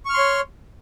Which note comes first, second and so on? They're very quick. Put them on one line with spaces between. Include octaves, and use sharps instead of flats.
C#6 F6 C6 C#5